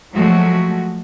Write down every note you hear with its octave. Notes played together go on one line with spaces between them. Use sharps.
F3 F#3 G#3 A3 F#4